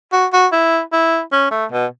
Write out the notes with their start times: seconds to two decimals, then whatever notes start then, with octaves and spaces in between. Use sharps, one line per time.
0.12 F#4
0.33 F#4
0.52 E4
0.92 E4
1.32 C#4
1.51 A3
1.72 B2